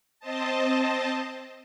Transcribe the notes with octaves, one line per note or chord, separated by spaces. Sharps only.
C4 C5 D#5 A5